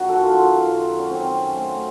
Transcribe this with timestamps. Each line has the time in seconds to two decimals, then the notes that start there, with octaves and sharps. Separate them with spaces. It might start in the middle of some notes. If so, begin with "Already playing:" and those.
Already playing: F#2 D#3 F#3 F#4
0.09 A4
0.23 F4
0.67 F#2 D#3 F#3
0.99 C#4
1.11 C4
1.55 A2 F#3